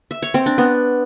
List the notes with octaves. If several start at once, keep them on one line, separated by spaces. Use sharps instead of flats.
E5
C#5
C4
D4
B3